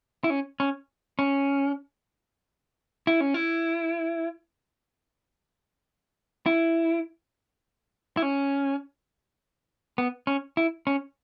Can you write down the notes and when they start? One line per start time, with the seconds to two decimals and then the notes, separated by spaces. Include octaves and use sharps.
0.24 E4
0.30 C#4
0.60 C#4
1.19 C#4
3.07 E4
3.21 C#4
3.34 E4
6.46 E4
8.17 E4
8.22 C#4
9.98 B3
10.27 C#4
10.57 E4
10.87 C#4